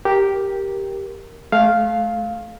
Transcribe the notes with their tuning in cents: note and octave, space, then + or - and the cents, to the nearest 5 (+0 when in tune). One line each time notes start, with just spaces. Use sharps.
G4 +0 A#4 +0
A3 -35 F5 +0